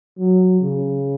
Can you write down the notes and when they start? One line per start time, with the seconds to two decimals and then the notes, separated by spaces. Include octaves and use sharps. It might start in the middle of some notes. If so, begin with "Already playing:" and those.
0.18 F#3
0.61 C#3